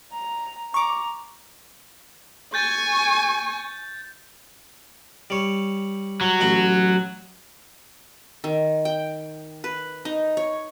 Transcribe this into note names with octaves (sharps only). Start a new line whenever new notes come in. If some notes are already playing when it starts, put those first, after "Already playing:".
A#5
A#5 C#6 D6
G#5 C#6 G6 A6
G3 C#5
F#3
A1 F#4 B5
D#3
G5
B4
D#4
C#5